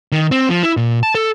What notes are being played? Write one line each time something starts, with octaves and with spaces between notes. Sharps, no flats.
D#3
C4
F3
E4
A#2
A5
A4